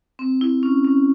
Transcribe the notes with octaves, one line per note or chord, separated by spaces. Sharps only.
C4
E4
C#4
C#4